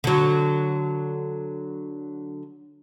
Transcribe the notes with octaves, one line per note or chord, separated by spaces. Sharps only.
D3 F#3